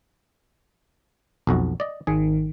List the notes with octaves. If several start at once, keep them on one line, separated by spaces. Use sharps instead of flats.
B1 F2 F#4
D5 D#5
G#1 D#3 G#4